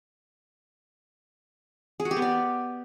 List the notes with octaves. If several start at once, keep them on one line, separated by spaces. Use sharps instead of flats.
G#4
F#4
G4
B3
D5